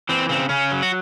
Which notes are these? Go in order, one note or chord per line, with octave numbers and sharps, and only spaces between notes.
E3 C4
C#3 C4
C#3 C#4
F#3
F#4